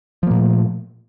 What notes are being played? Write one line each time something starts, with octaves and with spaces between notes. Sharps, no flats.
A#2 F3 A3 A#3